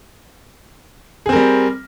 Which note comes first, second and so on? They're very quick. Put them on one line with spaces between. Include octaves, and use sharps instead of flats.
G#4 C4 A#4 G3